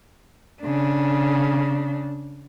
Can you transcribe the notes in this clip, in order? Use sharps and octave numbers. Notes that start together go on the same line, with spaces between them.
C#3 D4